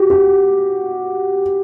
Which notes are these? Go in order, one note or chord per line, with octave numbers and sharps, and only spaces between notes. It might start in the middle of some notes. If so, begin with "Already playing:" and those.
Already playing: F#4 G4
G4